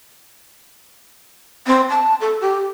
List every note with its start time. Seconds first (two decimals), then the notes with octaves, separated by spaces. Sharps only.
1.67 C4
1.90 A5
2.21 A4
2.41 G4